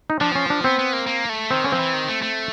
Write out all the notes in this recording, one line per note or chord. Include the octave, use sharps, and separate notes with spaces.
D#4
F3 D4
C#4
D4
B3 C4
B3
A#3
A#3
A3
D#3 C4
D3 C#4
F3 C4
E3
D#3
A3
A3